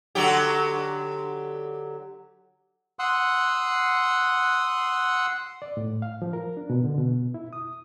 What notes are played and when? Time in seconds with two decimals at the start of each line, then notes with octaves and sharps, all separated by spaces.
0.15 D3 F#3 G4
2.99 F#5 C6 D#6 E6 F#6
5.62 D5
5.77 A2
6.02 F5
6.22 F3
6.33 A#4
6.57 D4
6.70 B2
6.84 D3
6.98 B2
7.34 E4
7.53 D#6